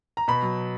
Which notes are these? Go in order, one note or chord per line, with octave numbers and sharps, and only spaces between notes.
A#5
B2 B5
F#3